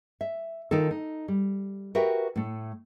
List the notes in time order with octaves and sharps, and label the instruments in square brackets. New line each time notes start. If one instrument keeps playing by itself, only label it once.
[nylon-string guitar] E5
D#3 D#4 F4 A4
D#4
G3
F#4 G4 A#4 B4 E5 G5
A2 A3